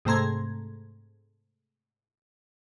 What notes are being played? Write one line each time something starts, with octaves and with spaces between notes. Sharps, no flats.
G#2 C3 A3 A#5 C6 G#6